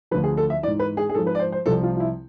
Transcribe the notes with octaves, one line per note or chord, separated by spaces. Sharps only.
D2 D3 F3 B4
G#4
A4
E5
G#2 E3 D5
B4
G#4
G#4
G#2 F3 A4
B4
D5
C5
C5
C2 C3 F3 A4
F4
F4
E4